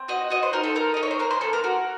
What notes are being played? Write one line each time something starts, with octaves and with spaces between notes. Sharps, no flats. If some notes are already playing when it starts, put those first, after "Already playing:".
Already playing: C4
F#4 D#5
F#4 D#5
C5
D#4 A#4
A4
A4 A#4
D#4 D#5
C#5
C5
A#3 A#4
C5
A#3 A4
A#4
F#4 A#4